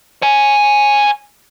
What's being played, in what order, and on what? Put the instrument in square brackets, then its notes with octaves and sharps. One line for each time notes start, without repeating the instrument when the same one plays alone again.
[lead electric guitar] C#5 G#5